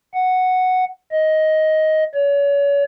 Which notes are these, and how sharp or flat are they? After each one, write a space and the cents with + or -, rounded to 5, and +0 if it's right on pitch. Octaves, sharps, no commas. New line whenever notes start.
F#5 +0
D#5 +10
C#5 +35